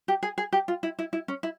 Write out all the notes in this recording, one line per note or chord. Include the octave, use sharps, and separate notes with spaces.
G4
G#4
G#4
G4
F4
E4
E4
E4
C#4
E4